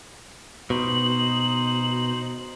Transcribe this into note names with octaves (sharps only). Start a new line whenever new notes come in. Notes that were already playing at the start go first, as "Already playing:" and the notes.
B2 D#4 C5 F#7